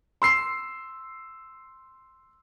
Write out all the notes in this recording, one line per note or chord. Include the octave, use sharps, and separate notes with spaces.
C6 E6 C7